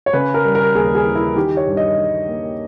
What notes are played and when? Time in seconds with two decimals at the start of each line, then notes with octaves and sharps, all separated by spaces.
0.06 C#5
0.13 C#3 B4
0.34 A#4
0.45 G3
0.55 A#4
0.75 D#2 G#4
0.95 G#4
1.05 E3
1.15 E4
1.36 D#3 G4
1.57 C#5
1.67 G2
1.77 D#5
1.98 G2
2.28 A#3